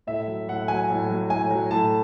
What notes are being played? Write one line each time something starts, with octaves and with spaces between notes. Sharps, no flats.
A2 E5
F#3
A2 F#5
F#3 G#5
A2
F#3
A2 G#5
F#3
A2 A5